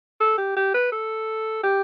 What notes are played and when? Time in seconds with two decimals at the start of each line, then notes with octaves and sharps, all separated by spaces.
0.21 A4
0.38 G4
0.57 G4
0.74 B4
0.92 A4
1.64 G4